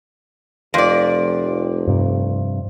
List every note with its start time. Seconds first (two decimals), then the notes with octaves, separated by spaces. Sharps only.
0.74 F1 F2 D5
1.87 G2 C3